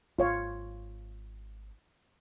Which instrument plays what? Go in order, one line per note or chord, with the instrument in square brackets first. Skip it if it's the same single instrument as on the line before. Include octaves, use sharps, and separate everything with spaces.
[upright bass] G#1 [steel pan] F4 C#5 F5